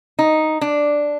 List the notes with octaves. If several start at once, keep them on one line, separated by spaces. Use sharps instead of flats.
D#4
D4